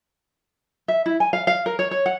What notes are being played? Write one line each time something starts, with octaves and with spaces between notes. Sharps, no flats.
E5
E4
G#5
F5
F5
A#4
C#5
C#5
F#5